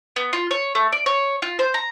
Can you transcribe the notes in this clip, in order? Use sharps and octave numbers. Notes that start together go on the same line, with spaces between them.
B3
F4
C#5
A3
D5
C#5
F4
C5
A#5